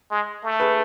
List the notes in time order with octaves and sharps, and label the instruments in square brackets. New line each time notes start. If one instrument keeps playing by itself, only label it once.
[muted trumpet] G#3
A3
[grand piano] G#4 B4